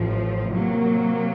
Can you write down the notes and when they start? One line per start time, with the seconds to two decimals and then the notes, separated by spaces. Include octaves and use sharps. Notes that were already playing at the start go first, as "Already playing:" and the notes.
Already playing: A1 A2 F3
0.50 C3 F#3 A#3